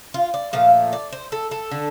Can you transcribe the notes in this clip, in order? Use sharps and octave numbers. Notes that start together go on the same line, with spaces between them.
F4
D5
A#2 F3 A3 F5
D5
C5
A4
A4
D3